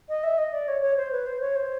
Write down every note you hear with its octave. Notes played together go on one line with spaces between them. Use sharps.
D#5
E5
D#5
D5
C#5
C#5
C5
B4
C5
C#5
C5